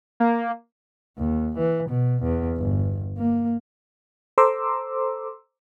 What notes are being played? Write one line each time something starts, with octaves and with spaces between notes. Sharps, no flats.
A#3
D#2
E3
B2
E2
G1
A#3
A4 C5 A#5 C6 D6 E6